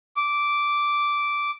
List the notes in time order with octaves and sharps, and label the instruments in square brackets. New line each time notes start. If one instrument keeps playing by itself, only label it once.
[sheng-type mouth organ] D6